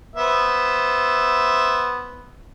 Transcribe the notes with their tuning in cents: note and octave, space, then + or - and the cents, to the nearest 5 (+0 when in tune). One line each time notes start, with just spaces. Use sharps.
B3 +0 C5 +0 E5 +0